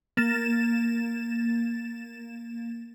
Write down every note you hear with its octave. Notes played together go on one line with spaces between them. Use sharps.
A#3 A6 E7